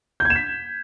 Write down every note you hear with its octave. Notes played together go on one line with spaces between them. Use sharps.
G6
G#6
E7
B6